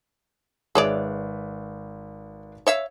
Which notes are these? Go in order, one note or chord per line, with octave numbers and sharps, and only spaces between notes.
G#1 G#4 B4 C#5 D5 E5
C#5 E5 F5